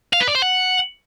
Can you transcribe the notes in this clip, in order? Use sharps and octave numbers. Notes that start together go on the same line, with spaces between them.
F5
B4
D5
C5
F#5